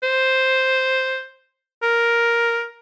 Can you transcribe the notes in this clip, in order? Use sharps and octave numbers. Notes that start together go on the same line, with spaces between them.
C5
A#4